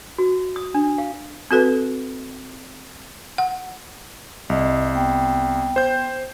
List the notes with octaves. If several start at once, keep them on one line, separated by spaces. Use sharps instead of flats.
F#4
D#6
D4
F5
C4 F#4 A4 B4
F#5
C2 D#5
B3 G5
C5 G6